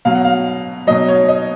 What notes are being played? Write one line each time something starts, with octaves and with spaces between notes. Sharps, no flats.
B2 F#3 F5
F#5
F5
B2 F#3 D#5
C#5
D#5